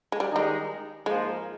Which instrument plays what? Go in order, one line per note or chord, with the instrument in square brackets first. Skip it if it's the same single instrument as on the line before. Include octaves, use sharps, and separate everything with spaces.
[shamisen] G#3
G3
[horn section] D#3 G#3 D#4 [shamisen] G3
[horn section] G#2 F3 A#3 F4 [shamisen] G#3